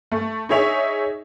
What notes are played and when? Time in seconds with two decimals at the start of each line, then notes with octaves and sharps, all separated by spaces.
0.12 A3
0.49 D#4 G#4 C#5 E5 F7